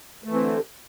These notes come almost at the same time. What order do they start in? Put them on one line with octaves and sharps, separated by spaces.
A3 E3 C4 D3